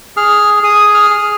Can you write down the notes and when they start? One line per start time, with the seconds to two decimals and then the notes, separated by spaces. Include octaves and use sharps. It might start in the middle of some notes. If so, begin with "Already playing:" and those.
0.17 G#4 F6
0.63 G#4 D#6
0.94 F6
1.10 G#4